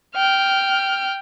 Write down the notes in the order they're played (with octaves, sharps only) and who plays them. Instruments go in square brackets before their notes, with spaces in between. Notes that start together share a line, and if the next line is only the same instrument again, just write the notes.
[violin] G5 F6